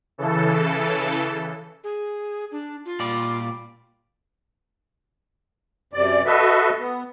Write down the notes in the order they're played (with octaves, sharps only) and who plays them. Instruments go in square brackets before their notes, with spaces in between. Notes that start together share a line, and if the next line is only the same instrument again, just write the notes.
[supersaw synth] C#3 E3 A4
[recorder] G#4
D4
F4
[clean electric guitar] A#2 G3 D5
[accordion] F#2 C3 D5
F#4 A4 B4 D#5 E5
B3